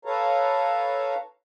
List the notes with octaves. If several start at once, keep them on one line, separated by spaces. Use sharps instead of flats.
A4 B4 C#5 F5 A5 A#5